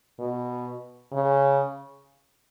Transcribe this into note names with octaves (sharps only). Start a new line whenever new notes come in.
B2
C#3